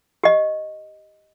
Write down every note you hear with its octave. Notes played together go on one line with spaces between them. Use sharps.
G4 D#5